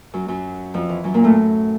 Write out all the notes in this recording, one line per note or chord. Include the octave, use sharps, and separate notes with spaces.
F#2 F#3
F#2 F#3
F2 F3
E3
F#2 F#3
A#2 A#3
A2 A3